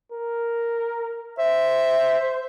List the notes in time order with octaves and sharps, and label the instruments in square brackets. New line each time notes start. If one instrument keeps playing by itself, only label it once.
[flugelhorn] A#4
[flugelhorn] C5 [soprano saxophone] E5